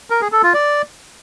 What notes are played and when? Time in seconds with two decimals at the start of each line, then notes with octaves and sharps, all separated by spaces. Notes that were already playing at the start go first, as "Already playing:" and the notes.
0.10 A#4
0.21 G#4
0.32 A4
0.43 F4
0.54 D5